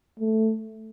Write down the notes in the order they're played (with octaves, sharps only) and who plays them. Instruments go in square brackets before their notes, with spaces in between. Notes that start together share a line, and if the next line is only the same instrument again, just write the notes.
[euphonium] A3